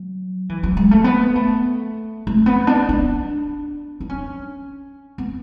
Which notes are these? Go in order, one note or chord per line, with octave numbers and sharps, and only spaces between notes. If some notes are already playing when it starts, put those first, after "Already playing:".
Already playing: F#3
E3
F#3
G#3
A3
B3
A3
A3
B3
D4
D4
D4
C#4
B3